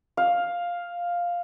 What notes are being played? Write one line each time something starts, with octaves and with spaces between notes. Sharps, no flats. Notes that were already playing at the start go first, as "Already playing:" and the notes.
F5